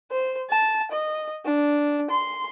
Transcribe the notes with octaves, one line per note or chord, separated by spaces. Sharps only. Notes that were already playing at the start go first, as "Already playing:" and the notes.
C5
A5
D#5
D4
C6